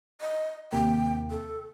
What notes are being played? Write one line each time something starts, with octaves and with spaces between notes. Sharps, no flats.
D#5
D#2 C3 A#3 G5
A4